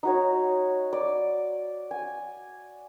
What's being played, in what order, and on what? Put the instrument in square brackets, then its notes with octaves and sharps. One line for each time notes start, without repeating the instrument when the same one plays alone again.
[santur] D#4 F#4 C#5
D5
G#5